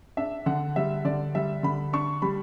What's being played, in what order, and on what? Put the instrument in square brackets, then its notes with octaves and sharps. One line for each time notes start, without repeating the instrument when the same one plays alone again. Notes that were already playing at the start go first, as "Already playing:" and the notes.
[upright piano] D4 E5
D3 F#5
G3 E5
D3 D5
G3 E5
D3 B5
D4 C#6
G3 B5